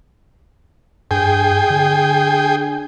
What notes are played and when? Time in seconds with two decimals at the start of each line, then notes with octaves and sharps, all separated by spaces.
1.11 G2 G#4 G5
1.70 D3